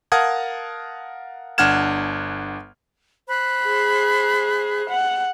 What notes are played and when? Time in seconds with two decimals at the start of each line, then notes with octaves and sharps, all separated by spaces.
0.12 A#4 F5 F#5 A5 D#6 G#6
1.58 G1 D4 F#5 F6 G#6 E7
3.29 C5 B5 F#6
3.66 G#4
4.90 F#5